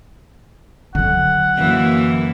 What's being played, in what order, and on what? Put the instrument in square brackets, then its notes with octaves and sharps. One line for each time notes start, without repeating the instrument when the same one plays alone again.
[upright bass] D3 F#3 [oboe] F#5
[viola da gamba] F#2 E3 A#3